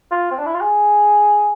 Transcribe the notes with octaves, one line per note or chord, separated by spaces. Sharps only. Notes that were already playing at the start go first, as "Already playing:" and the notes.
F4
C4
D4
E4
F4
G#4